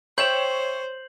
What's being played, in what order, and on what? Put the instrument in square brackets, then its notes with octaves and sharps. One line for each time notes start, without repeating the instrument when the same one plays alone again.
[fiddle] C5 [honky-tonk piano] C#5 E7 [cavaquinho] E5 G5 [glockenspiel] G6 C7 F#7